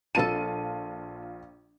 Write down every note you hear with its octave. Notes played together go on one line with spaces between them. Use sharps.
A#1 F4 A4 A5 D#7